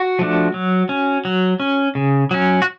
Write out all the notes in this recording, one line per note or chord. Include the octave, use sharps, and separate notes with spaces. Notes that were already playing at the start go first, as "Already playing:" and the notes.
Already playing: F#4
F3 A3 D4
F#3
C#4
F#3
C#4
C#3
F#3 C#4
F#4